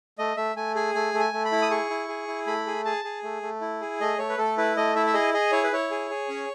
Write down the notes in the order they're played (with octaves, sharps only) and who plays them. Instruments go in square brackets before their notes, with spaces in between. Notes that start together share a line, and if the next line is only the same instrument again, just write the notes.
[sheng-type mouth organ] A3 D#5
A3 E5
A3 G#5
G#4 G#5
A3 G#5
A3
G#5
A3
B5
E4
D#6
G#4 C#6
E4
G#4
E4
A3 B5
G#4
G#4 A5
G#4
A3
A3
E4
G#4
A3 D#5
A3 C#5
B4
A3 A4
E4 B4
A3 D#5
E4 E5
E5
G#4 D#5
G#4 D#5
E4 C#5
B4
E4 C#5
G#4
G#4
C#4